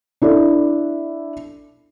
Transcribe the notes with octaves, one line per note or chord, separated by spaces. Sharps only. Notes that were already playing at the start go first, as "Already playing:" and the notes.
D4 E4 A4 D5